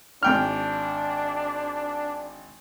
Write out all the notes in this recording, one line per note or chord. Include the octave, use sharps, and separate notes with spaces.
G#1 D4 G5 F6